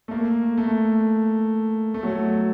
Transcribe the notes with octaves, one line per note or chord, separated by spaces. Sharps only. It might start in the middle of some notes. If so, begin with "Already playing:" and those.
A3
A#3
A3
A3
F#3
A3